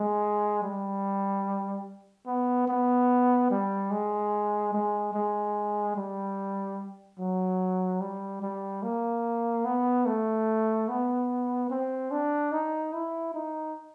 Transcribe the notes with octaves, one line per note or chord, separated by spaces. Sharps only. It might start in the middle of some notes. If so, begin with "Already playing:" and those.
Already playing: G#3
G3
B3
B3
G3
G#3
G#3
G#3
G3
F#3
G3
G3
A#3
B3
A3
B3
C4
D4
D#4
E4
D#4